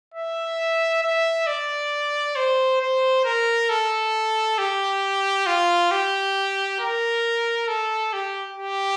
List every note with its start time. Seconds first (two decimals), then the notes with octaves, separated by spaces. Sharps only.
0.14 E5
1.03 E5
1.47 D5
2.36 C5
2.81 C5
3.25 A#4
3.70 A4
4.58 G4
5.46 F4
5.91 G4
6.80 A#4
7.68 A4
8.13 G4
8.57 G4